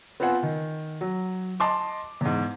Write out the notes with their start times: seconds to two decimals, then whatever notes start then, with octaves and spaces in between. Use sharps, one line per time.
0.20 B3 C4 F4 C5 F#5 G#5
0.43 D#3
1.01 F#3
1.60 D#5 A5 C6 D6
2.21 E2 G#2